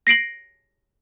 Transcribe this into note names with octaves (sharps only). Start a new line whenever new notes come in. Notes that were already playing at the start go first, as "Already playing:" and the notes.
A#6 C7 D7 F#7